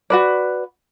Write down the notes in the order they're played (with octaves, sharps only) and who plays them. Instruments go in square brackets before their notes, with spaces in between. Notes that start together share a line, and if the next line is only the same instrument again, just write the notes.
[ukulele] F#4 B4 D5